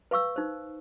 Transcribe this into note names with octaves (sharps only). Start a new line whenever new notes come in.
B4 F5 C#6 E6
D#4 C5